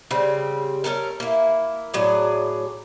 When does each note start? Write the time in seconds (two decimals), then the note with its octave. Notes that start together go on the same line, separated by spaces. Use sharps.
0.11 C#3 G3 C4
0.84 C#4 D4 A4 A#4
1.20 A#3 E4
1.94 A2 F#3 G#4 D5